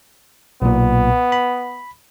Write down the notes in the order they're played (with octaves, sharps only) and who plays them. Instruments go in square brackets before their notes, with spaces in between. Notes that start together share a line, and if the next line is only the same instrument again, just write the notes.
[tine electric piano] B1 A#2 [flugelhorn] B3
[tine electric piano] B5